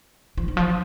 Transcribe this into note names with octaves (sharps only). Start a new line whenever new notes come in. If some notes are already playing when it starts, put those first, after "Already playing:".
F3
D#3
F3